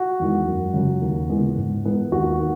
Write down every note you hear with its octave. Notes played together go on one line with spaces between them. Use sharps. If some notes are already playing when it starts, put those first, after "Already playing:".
Already playing: F#4
E2 D#3 G#3
F#2
C#3 F#3
D#2
C#3 E3 G#3 B3
G#2
E3 G#3 B3
D#2 F#4
D#3